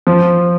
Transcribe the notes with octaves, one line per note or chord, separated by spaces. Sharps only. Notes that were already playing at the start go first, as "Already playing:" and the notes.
F3